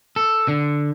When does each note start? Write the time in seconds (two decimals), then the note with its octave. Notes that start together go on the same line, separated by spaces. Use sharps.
0.16 A4
0.48 D3